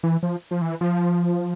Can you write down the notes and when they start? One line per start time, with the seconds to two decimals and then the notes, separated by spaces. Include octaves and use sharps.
0.03 E3
0.23 F3
0.51 F3
0.61 E3
0.81 F3